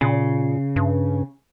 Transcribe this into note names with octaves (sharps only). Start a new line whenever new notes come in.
A#2 C#3
G2